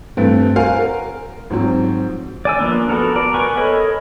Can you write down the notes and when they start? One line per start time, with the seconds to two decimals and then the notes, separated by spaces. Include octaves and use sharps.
0.17 G2 E3 A3 C4
0.56 F#4 A#4 C5 F5 G#5
0.79 A#4
1.50 G#2 F3 F#3 C4
2.45 D5 G#5 E6
2.59 F3 A#3 B3 D4
2.89 B3 F#4 A4 A#4
3.15 A#4 D5
3.34 B3 A#4 B4 G#5 C#6
3.57 A4 A#4 C#5 D#5 B5